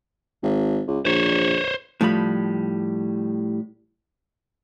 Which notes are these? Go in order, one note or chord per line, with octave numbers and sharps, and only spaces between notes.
G#1
C#2
A#1 C5 C#5
A2 F3 G3 B5